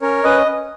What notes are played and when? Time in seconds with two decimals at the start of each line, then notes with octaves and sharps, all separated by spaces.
0.02 C#4 A#4 C#5
0.24 C#4 B4 D#5